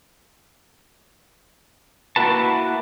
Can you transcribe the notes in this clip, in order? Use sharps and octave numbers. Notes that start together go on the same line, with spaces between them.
A#3 E4 F#4 B4 A5